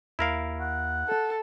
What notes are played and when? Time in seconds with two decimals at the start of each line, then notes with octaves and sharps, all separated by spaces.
0.19 D#2 E4 A#4 F5
0.60 F#5
1.08 A4